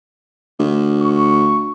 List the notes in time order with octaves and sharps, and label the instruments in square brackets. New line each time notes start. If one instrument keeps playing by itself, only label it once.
[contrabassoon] D2
[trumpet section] C#6